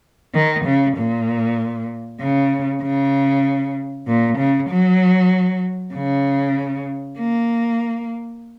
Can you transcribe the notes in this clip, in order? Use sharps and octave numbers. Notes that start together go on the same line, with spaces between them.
D#3
C#3
A#2
C#3
C#3
A#2
C#3
F#3
C#3
A#3